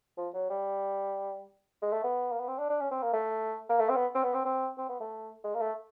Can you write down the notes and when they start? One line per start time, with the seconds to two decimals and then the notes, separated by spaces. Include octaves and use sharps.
0.17 F3
0.34 F#3
0.50 G3
1.82 G#3
1.92 A3
2.04 B3
2.32 A#3
2.40 B3
2.48 C4
2.58 D4
2.69 D4
2.80 C#4
2.91 C4
3.02 A#3
3.13 A3
3.69 A#3
3.79 A3
3.89 C4
3.96 B3
4.15 C4
4.23 B3
4.34 C4
4.45 C4
4.78 C4
4.89 B3
5.00 A3
5.44 G#3
5.54 A#3
5.60 A3